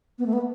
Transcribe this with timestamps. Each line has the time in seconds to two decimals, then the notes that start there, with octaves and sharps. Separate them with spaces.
0.18 B3
0.26 A3
0.32 B3